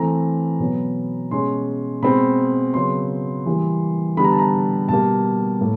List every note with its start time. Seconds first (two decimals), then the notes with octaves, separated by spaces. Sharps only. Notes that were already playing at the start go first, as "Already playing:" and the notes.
Already playing: E3 A3 C4 A#5
0.60 B2 F#3 B3
1.31 B2 G#3 C#4 C6
2.03 B2 G#3 C4 B5
2.74 C#3 F#3 B3 C6
3.46 E3 G3 A#3
4.17 D3 G3 B3 B5
4.24 A#5
4.31 A5
4.39 A#5
4.89 B2 G3 A#3 A5
5.61 A2 A#3